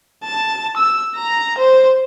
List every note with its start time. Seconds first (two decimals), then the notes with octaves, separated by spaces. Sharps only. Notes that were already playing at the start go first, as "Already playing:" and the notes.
0.24 A5
0.77 E6
1.16 A#5
1.58 C5